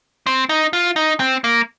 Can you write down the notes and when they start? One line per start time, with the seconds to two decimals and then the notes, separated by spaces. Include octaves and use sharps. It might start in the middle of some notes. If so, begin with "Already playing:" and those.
0.27 C4
0.49 D#4
0.73 F4
0.96 D#4
1.20 C4
1.44 A#3